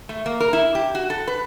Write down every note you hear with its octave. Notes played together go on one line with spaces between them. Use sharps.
A3
A#3
A#4
E4
G4
F#4
A4
B4